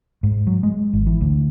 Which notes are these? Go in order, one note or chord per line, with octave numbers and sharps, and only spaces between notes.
G#2
F#3
G#3
G#1
E3
D2